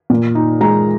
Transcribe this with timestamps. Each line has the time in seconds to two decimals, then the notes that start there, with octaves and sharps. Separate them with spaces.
0.10 A#2
0.35 D#4
0.61 G#3 A#5